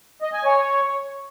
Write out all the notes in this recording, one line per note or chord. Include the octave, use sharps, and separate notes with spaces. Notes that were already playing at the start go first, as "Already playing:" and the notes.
D#5
G#5
C#5